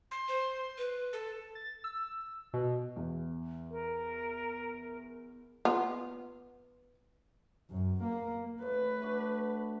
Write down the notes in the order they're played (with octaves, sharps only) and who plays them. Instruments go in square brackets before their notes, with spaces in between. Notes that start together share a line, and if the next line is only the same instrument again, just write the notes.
[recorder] C6
[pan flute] C5
B4
[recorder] A4
[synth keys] A6
E6
B2
[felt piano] E2
[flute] A#4
[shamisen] B3 F4
[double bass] F#2
A#3
[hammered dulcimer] A2 [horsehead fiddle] B4
[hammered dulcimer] A3 D4 F#4